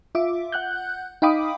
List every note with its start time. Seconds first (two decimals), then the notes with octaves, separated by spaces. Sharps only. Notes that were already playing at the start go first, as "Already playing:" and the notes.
0.15 F4 E5 D6
0.52 F#5 F#6 G6
1.22 D#4 F5 G5 B5 D6 D#6